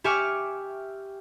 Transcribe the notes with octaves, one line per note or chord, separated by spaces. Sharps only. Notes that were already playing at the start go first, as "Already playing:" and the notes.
G4 E5 G#5 C#6 D6 F6